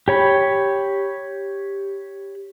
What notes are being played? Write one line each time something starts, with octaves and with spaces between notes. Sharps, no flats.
G4 C#5 B5